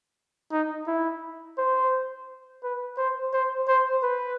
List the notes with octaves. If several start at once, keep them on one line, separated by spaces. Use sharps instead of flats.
D#4
E4
C5
B4
C5
C5
C5
B4